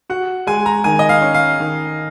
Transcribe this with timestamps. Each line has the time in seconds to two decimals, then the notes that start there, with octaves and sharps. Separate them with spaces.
0.10 F#4 F#5
0.47 G#3 G#5
0.66 A#5
0.84 D#3 G#5
0.99 D#5
1.09 F5
1.21 C#4
1.34 F5
1.60 D#3